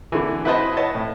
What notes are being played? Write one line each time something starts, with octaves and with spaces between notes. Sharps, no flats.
D3 E3
E4 F#4 B4 C5 D#5 A5
B4 C#5 D#5 F#5 A5
A2